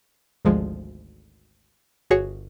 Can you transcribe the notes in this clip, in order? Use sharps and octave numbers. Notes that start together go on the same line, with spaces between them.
G#1 D2 F3 G#3
G1 F#4 G#4 C#5